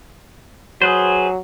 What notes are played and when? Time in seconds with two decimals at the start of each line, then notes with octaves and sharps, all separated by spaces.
0.82 F#3 G#4 B4 C5